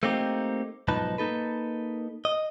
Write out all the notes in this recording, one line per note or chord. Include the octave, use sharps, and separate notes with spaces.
A3 A#3 C4 D#4 G4
B1 G#2 F3 D#4 B4 A5
A#3 D#4 A4 B4
D#5